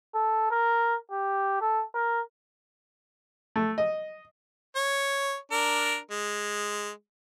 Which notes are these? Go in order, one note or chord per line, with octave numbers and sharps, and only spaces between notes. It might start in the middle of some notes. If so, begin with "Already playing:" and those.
A4
A#4
G4
A4
A#4
A3
D#5
C#5
D4 A#4
G#3